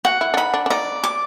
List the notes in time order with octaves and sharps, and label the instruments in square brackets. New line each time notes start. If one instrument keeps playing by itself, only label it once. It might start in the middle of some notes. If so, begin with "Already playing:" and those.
[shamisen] F#4 [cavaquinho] F#5
[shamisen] E4
D4
[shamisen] D#4 [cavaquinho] B5
[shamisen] D4
D4
[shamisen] D#4 [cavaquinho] D5
[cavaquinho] D6